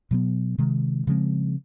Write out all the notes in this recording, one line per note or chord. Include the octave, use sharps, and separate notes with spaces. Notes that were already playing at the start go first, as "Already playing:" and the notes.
B2 F#3 B3
C3 D#3 G#3
C#3 F3 G#3 C4